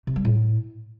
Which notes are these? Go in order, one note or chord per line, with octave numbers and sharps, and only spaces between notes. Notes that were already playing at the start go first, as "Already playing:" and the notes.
C3
G3
A2